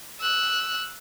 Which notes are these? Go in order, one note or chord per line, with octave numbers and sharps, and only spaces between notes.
E6 F#6